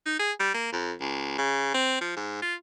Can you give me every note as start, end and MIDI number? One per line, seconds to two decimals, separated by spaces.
0.06 0.17 63
0.19 0.32 68
0.40 0.51 55
0.54 0.69 58
0.73 0.93 41
1.00 1.36 37
1.38 1.70 49
1.74 2.00 60
2.01 2.14 53
2.16 2.40 44
2.42 2.54 65